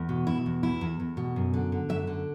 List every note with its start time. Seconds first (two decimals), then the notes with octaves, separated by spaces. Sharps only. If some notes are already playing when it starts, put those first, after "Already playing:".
Already playing: E2
0.09 B2
0.27 B2 E4
0.46 E2
0.63 E2 E4
0.81 E2
1.00 E2
1.17 B2
1.36 F#2
1.54 D3
1.72 D3
1.89 F#2 E5
2.07 D3